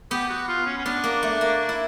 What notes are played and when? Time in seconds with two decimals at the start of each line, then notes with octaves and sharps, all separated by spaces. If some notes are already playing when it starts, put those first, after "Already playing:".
0.11 B3 G4
0.29 F#4
0.48 F4
0.66 C#4
0.77 C#4
0.86 B3 D4
1.04 A#3
1.23 A3
1.41 A#3
1.69 E4